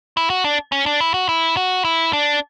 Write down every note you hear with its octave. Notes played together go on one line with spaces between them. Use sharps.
E4
F#4
D4
C#4
D4
E4
F#4
E4
F#4
E4
D4